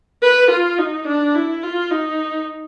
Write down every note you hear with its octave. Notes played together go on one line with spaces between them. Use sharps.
B4
F4
D#4
D4
E4
F4
D#4